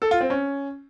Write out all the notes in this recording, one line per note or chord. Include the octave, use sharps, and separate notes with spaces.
A4
F4
C4
C#4